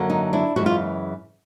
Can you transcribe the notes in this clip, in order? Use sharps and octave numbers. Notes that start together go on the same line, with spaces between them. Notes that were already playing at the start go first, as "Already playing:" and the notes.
Already playing: F#2 D3 F#3 A#3
D#4
D4 E4
F#2 C#3 E3 G#3 B3 F#4
F4